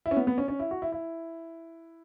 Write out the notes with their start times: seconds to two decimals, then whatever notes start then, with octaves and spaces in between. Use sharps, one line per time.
0.06 E4
0.11 C#4
0.17 B3
0.27 B3
0.38 C#4
0.48 C#4
0.60 E4
0.71 F#4
0.82 E4
0.92 E4